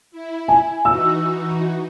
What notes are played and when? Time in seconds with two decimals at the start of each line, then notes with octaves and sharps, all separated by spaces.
0.11 E4
0.48 G#5
0.85 E3 D#4 F#4 E6